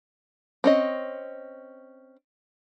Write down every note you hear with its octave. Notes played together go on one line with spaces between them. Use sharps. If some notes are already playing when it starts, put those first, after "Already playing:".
C4 C#4 D#5